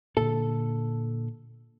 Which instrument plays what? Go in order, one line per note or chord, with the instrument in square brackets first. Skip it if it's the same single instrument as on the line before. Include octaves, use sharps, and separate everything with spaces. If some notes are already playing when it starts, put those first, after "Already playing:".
[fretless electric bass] A#2 D3 [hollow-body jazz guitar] A4